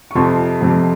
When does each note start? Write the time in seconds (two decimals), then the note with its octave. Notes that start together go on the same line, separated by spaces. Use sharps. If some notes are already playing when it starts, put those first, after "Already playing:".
0.11 C#6
0.15 F2 C3 F3 C6
0.61 F2 C3 F3